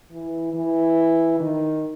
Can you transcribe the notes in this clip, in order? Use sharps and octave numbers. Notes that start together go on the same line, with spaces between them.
E3
E3
D#3